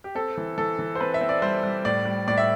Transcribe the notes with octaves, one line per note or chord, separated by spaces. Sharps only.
G4
C4 A4
E3
E3 A4
E3
C5
C4 B4
E5
C4
D5
G3 C5
G3
A2 D5
G3
A2 D5
E5